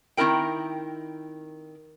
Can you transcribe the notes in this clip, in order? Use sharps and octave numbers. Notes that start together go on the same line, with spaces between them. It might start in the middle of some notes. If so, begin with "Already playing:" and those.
D#3 C4 E4 A#4 G5